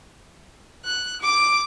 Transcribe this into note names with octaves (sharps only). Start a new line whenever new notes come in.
F#6
D6